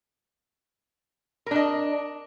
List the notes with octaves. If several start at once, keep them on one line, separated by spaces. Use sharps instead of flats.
D4 A#4 D#5